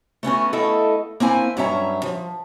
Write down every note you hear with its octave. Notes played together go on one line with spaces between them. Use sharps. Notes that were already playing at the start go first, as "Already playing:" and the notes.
A3 B3 C#4 F#4
A3 E4 A4 D#5 F5
A#3 C4 E4 G#5
G2 F#3 C#4 E5 A#5
F3